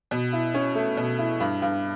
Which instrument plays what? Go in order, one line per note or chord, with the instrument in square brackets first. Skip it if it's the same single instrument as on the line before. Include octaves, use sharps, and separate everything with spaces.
[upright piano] B2
E4
C#4
A3
B2
E4
G2
G2